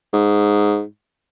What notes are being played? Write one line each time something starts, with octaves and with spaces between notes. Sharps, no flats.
G#2